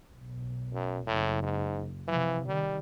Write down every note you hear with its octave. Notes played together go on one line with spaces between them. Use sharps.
B1
F#2
F#1 A2
G#2
C3 E3 F3
D#3 G3